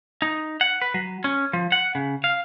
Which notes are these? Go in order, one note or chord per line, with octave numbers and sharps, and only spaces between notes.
D#4
F#5
B4
F#3
C#4
F3
F#5
C#3
F5